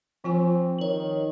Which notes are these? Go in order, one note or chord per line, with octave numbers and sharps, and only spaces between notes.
F3 C4 F4 G#5
D#3 C#5 F#7